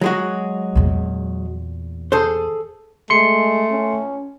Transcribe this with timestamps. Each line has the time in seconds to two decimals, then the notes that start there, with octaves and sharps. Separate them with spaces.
0.01 F#3 G#3 F#4
0.75 E2 A#2
2.12 G#4 A4 C5
3.10 G#3 A3 C6 C#7
3.71 C#4